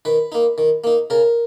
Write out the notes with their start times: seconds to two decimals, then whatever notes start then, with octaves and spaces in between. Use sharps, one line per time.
0.05 D#3 B4
0.32 A#3 D#4
0.58 D#3
0.84 A#3 D#4
1.10 C#3 A#4